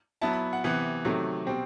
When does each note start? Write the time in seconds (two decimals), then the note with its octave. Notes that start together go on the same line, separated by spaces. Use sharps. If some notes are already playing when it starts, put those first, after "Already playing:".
0.22 F#3 B3 E4 A5
0.33 B5
0.53 F#5
0.64 C3 E3 B3 F#5
1.05 C3 D#3 F#3 A3
1.47 B2 G3 C4 G5